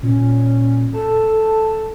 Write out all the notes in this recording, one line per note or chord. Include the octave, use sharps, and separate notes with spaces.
A#2 C#4
A4 A5